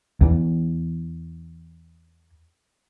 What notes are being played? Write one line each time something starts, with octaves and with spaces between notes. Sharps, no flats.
E2 E3